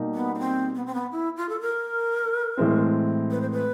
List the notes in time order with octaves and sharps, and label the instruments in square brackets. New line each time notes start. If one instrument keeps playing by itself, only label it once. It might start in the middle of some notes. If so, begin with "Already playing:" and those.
Already playing: [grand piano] B2 G3 A#3 D#4 G4
[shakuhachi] B3
C#4
C4
B3
C4
B3
E4
F4
A4
A#4
[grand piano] A2 E3 G#3 C4
[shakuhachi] B4
C5
B4